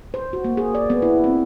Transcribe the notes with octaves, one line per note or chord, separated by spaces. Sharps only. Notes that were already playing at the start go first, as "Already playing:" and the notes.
C5
F#4
A#3
G#4
D5
B3
E4
C4